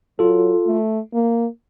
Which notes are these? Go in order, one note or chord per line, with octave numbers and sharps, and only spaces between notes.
F#3 F4 A4
A3
A#3